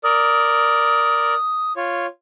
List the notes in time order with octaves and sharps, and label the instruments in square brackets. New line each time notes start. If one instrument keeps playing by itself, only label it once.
[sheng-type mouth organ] A#4 D5 [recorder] D#6
[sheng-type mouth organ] F4 C#5